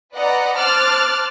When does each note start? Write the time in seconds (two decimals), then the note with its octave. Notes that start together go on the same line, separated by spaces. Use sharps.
0.14 B4 D5 D#5 F#5 A#5
0.58 C5 A5 D6 F6 F#6 A6